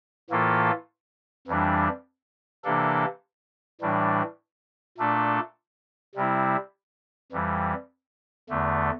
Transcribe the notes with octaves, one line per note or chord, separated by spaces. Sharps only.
A2 E3 A#3 F4 A4
F2 E3 G3 D4
C3 E3 A#3 D4 A4
A2 E3 G3 D4
A#2 A3 D4 A4
C3 G3 C4 E4
F2 E3 G3
E2 D3 A3